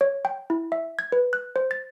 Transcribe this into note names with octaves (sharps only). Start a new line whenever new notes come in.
C#5
G5
E4
E5
G#6
B4
F#6
C5
A6